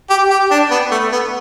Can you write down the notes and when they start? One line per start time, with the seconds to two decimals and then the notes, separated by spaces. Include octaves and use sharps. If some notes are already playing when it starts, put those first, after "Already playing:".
0.09 G4
0.30 G4
0.51 D4
0.71 B3
0.91 A3
1.12 B3